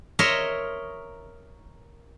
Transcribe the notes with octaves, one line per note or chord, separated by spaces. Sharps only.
A#4 C#5 D#5 E5 C6